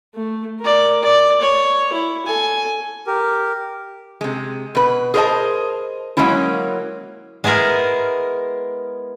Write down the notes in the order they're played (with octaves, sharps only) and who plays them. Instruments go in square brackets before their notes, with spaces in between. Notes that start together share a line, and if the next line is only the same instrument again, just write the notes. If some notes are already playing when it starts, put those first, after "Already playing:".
[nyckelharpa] A3
A#4 D5
D5
C#5
E4
A4 G#5
[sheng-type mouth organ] G4 A#4
[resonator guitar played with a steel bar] C3 G#3
B2 B4
G#4 A#4 C5 C#5 D#5 A5
F#3 G#3 A#3 C#4 E4
[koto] G#3 B3 E4 G#4 A#4